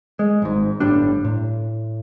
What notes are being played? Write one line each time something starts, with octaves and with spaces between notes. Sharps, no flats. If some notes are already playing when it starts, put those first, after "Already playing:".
G#3
G#1 G#2
G1 A2 G3 D4
A2